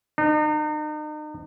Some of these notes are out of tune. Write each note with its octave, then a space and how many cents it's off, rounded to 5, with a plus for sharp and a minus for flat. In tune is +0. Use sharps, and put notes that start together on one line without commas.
D#4 -40